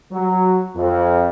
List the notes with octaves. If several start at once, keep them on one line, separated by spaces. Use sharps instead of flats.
F#3
F2